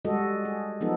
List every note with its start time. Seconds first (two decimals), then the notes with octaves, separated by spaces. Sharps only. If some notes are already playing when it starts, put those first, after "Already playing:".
0.05 G3 G#3 F#4 A4 D#5
0.45 G#4
0.81 F3 F#3 B3 D#4 A4